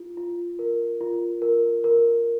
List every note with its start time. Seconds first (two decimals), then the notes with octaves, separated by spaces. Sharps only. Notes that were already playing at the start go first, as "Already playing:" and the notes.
Already playing: F4
0.17 F4
0.59 A#4
1.01 F4
1.42 A#4
1.84 A#4